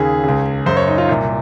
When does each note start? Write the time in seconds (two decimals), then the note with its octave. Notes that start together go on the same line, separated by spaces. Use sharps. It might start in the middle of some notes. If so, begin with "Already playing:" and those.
Already playing: D#2 C#3 G#4
0.24 C#2 C#3
0.66 F#2 C#3 C5
0.77 C#5
0.87 D#4
0.98 F4
1.09 C2 A#2